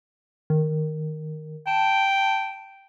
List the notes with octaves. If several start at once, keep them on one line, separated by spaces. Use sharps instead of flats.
D#3
G5 A5